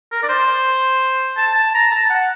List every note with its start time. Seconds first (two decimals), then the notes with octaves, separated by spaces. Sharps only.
0.12 A#4
0.23 D5
0.29 C5
1.37 A5
1.55 A5
1.74 A#5
1.91 A5
2.10 F#5